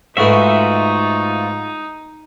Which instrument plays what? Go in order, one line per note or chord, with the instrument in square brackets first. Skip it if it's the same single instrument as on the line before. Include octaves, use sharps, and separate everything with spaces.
[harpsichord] G#2 A3 B4 [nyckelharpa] D#4 [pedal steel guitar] F4 F#4 E5